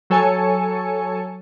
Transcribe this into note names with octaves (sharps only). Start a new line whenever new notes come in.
F#3 A4 C#5 G#5 A5 C#7